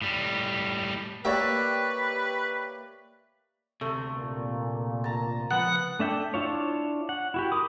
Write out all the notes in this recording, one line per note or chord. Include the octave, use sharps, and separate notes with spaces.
A2 G3
A#3 G4 B4 C#5 D5 E5
D2 C3 A3
A#2
A5 A#5
C#2 F3 B3 F#5
A3 D4 E5 G5
D4 E4 F4 C#5
F#5
E4 F#4 G4
A#4 B5 D6 D#6